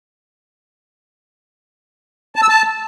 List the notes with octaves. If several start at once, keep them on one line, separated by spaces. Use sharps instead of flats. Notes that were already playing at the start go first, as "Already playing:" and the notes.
A5
E6
A5